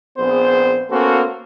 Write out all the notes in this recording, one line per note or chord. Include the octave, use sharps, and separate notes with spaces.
A#1 B3 C4 G#4 C5
A#3 B3 C#4 F#4 A4 C5